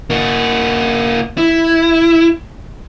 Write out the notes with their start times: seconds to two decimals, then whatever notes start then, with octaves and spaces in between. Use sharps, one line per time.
0.10 A#3 F#4
1.37 E4